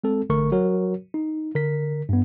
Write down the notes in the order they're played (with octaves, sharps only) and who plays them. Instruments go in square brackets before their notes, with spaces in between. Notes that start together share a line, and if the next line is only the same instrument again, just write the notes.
[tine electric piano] G#3 C4 A4
A1 D3 A3 A#4 C#6
F#3 F#4 A#4 C#5
D#4
D3 A#4 B6
G2 B3